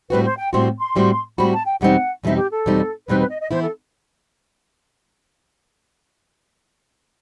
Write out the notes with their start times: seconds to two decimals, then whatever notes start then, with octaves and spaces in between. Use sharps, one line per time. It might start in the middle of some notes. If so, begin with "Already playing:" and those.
0.10 A2 G3 C4 F#4 B4
0.25 C5
0.39 G5
0.53 A2 G3 C4 F#4 C6
0.79 C6
0.96 A2 G3 C4 F#4
1.38 A2 G3 C4 F#4 B5
1.52 A5
1.66 G5
1.81 E2 B2 G3 C4 D#4 F#5
2.23 E2 B2 G3 C4 D#4 E5
2.37 G4
2.51 A4
2.66 E2 B2 G3 C4 D#4
3.08 E2 B2 G3 C4 D#4 B4
3.19 B4
3.30 D#5
3.40 D#5
3.51 E3 B3 E4 C5
3.62 A4